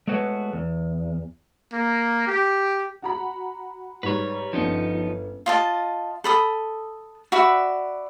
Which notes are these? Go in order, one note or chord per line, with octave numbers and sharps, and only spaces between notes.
G#3 A3 B3 F#4 B4 C#5
E2
A#3
G4
F#4 A#5 B5
G#2 G3 B4 C#5
G1 F3 B3 C#4 D#4
F4 D#5 A5
A4 B5 D#6
F#4 D5 E5 B5